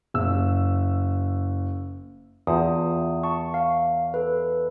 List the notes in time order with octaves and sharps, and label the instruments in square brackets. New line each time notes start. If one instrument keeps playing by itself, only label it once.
[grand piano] F#1 E6
[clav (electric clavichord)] E2 [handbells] F4 A5 D#6
[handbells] A5 C#6
F5
A4 B4